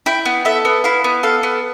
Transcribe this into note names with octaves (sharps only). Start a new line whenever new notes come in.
E4 G5
B3
A4 E5
B3
E4 F5
B3
A4 F5
B3